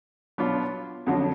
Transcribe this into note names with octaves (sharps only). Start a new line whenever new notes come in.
B2 F#3 B3 D4 F4
F2 D3 F#3